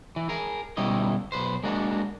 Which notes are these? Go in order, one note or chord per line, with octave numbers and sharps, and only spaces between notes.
E3
G#4 A#4
D2 B2 G3 C#4 E4 D#5
B1 B4 C5
G#3 A#3 D4 F#4